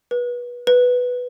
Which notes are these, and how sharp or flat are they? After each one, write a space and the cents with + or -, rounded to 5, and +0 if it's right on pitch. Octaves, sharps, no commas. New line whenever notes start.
B4 -25
B4 +0